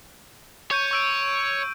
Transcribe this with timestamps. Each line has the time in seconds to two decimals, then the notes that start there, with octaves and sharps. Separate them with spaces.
0.71 C#5 C#6 G6 D#7
0.91 C#6 E6 D7